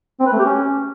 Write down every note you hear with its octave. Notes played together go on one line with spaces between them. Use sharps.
C4
B4
A3
G4
C#4